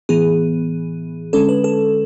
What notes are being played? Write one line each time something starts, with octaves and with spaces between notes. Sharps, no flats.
A2 E3 B3 G#4
D3 G#3 C#4 A4
B4
A4